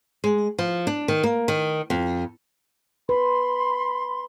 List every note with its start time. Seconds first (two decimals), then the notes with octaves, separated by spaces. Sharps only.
0.24 G#3
0.58 F3
0.87 D4
1.08 D#3
1.23 A#3
1.48 D#3
1.90 F2
3.09 B4 B5 C6